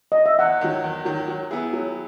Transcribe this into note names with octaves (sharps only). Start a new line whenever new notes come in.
D#5
E5
E2 F#5
D#3 F#3
E2
D#3 F#3
F#3
B3 E4 G#4
F#3